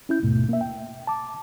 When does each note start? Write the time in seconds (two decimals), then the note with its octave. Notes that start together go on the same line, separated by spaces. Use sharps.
0.09 C#4 E4 G6
0.22 D#2 G#2 B2 A3
0.49 A#3 E5
0.61 G5
1.07 A5 D6